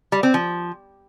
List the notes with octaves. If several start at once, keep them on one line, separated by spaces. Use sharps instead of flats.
G3
C4
F3